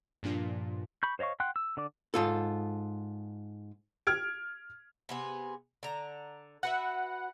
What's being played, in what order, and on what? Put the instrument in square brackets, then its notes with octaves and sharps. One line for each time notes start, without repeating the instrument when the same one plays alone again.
[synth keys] G2 A#2 F3 D4 F4
[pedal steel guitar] B5 C#6 G6
C5 C#5 D#5 F5 C#6
F#5 G5 C6 F#6
E6
D3 D5 D6
[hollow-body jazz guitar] G#2 F4 A4
[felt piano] F6 G#6 D7
[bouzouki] C3 B3 G#4
D3 A#5
[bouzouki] F#4 B4 E5 [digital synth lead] F#5